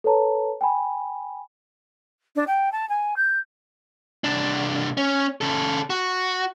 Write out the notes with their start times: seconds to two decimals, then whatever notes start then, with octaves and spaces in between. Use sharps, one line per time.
0.04 A4 B4 C#5 A5 A#5
0.61 G5 G#5 B5
2.36 D4
2.47 G5
2.72 A5
2.89 G#5
3.16 G6
4.24 C2 D4
4.97 C#4
5.41 C#3 A4
5.90 F#4